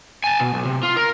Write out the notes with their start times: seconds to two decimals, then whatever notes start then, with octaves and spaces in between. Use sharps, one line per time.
0.24 G#5 A5
0.40 B2
0.54 B1
0.65 C3
0.83 F4
0.97 A#4